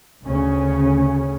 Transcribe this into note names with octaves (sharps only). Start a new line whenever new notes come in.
D2 C#3 C#4